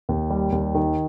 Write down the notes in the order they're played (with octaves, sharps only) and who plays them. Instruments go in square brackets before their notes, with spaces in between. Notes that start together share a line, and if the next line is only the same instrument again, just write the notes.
[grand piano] D#2
G3
D#2
D#3